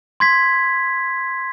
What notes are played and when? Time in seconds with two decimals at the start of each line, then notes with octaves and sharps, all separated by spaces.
0.20 C6 G#6 B6